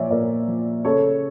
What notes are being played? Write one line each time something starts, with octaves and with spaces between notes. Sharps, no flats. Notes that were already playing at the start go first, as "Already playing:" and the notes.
Already playing: A#2 F3 C#5 D5 E5
A#2 A#4 D5
F3
C#3 A4 C#5